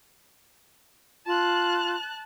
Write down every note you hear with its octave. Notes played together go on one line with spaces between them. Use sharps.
F4 A5 F#6